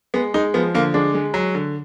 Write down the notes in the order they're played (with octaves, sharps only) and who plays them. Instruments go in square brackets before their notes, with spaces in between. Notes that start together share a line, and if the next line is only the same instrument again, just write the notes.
[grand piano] G#3 B3
G#3 D#4
F3 B3
D3 A#3
G#3 D4
G#3
F#3
D3